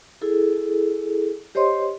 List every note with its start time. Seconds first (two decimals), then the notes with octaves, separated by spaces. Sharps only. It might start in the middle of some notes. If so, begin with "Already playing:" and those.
0.22 E4 G#4 A4
1.55 G4 C5 C#5 D#5 C6